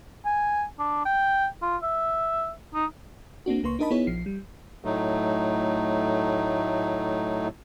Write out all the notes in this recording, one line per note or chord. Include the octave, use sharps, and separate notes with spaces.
G#5
D4
G5
F4
E5
D#4
A#3 C4 D4 F#4
C#2 A#3 B4 C6 C#6
D4 D#4 A#4 D#5 A5 B5
B3 D#4 E4 G#4 C#5
A#1 F3 C7
G3
A2 F#3 A3 D#4